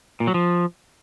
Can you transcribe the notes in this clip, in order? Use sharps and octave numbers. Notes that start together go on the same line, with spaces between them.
A#2
F#3
F3